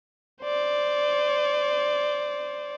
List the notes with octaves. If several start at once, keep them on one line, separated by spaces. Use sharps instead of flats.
C5 D5